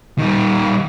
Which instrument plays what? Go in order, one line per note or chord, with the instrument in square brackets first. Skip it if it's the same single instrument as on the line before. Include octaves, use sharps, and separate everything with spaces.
[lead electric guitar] D#3 G3